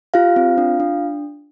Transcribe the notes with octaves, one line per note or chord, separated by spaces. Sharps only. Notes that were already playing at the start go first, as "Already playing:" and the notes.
F4 G4 F5
C4
D4
D4